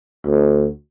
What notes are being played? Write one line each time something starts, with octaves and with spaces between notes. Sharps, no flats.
D2